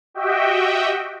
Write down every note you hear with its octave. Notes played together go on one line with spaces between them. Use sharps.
F#4 G4 D#5 E5 G5